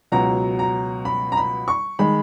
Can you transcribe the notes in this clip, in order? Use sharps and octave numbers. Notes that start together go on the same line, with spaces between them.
C#2 B2 F#3 A#5
A#5
B5
A#5
B5
C#6
D#3 G#3 B5